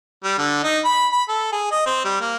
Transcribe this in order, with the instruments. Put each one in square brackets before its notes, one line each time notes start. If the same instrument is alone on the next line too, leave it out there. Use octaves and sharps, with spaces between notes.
[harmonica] G3
D3
D#4
B5
B5
A4
G#4
D#5
C4
G3
A#3